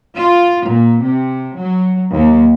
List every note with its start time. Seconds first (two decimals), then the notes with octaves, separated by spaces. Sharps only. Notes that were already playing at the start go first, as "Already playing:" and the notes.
0.16 F4
0.65 A#2
1.02 C3
1.56 F#3
2.12 D#2